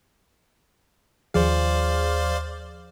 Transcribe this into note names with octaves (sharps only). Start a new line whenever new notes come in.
D#2 F3 G#4 C5 D5 F5